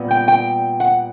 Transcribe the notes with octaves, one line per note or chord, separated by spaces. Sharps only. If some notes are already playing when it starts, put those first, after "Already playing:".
Already playing: A#2 G3 B3
G5
G5
F#5